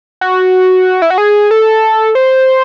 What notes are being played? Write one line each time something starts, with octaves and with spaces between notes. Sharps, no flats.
F#4
E4
F#4
G#4
A4
C5